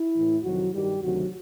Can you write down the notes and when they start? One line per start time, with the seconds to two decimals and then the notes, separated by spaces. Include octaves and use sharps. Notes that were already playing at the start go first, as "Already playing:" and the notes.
Already playing: E4
0.14 A2 E3
0.43 F2 C3 D#3 F#3 F#4
0.72 G2 D#3 G3 G4
1.01 D2 C3 D#3 F#3 F#4